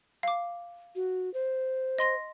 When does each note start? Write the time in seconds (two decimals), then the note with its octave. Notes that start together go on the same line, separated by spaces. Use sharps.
0.23 F5 D6
0.96 F#4
1.34 C5
1.99 D#5 C6 A#6